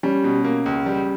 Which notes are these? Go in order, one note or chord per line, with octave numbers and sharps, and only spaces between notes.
G3 C#4
B2
A#3
C#2
G3